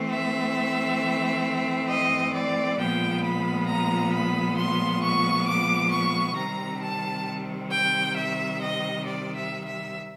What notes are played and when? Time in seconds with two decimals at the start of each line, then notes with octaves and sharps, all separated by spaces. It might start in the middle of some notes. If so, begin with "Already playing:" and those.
Already playing: E3 A3 C4
0.10 E5
1.89 D#5
2.34 D5
2.79 A#2 F3 G#3 B3 G5
3.23 B5
3.68 A#5
4.14 B5
4.58 C6
5.02 C#6
5.48 D6
5.92 C#6
6.36 C3 D#3 G3 C4 A#5
6.82 A5
7.71 G5
8.16 E5
8.62 D#5
9.06 D5
9.35 E5
9.65 E5